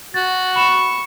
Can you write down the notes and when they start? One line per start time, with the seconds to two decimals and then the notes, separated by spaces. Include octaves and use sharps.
0.14 F#4 A6
0.56 B5 C#6 E7